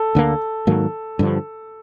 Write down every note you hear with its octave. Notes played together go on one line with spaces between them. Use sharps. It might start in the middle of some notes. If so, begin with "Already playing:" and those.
Already playing: A4
D2 D3 F3 A#3
G#2 D#3 F#3 A#3
G2 D3 F3